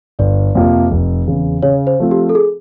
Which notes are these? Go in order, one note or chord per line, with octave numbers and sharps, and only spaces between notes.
G1 D5
F2 C3 F3 A#3
F1
E2 C#3
C#3 C#5
C5
F3 A3 C4 F4
G4
A4
G#4